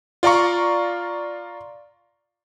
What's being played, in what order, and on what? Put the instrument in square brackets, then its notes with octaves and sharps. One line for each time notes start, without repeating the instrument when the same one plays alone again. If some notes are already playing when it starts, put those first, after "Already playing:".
[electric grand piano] F4 D5 F5 A#5 C#6